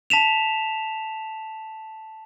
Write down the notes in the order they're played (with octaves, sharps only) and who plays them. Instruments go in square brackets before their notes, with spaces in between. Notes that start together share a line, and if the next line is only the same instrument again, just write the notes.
[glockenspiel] A5 B6 E7 F7